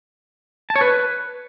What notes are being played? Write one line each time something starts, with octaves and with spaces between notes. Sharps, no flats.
A5
C#5
B4